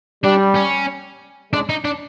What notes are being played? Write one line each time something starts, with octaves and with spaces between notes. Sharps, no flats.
G3 D4
C#4
G#3 D4
D#4
D4